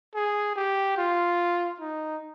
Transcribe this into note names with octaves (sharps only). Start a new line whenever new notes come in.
G#4
G4
F4
D#4